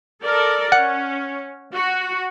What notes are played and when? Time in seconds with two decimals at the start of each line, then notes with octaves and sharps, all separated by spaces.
0.23 A4 A#4 D5
0.72 C#4 F#5
1.74 F#4